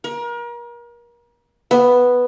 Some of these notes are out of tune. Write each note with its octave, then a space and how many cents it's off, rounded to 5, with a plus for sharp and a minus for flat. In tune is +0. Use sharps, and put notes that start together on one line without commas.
A#4 +35
B3 +0